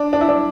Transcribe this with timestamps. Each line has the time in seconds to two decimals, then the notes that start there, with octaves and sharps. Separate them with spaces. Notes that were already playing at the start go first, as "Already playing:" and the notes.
Already playing: D4
0.13 D4
0.21 E4
0.29 D4